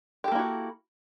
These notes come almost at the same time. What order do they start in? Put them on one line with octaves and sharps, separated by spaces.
G4 A4 A#3 E4 F#4